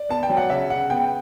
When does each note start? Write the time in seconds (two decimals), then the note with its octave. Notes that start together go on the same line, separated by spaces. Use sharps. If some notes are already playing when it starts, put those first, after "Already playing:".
Already playing: D5
0.09 B3 A5
0.23 G5
0.29 F#3
0.37 F#5
0.50 C#3 E5
0.70 C#3 F#5
0.90 B3 G5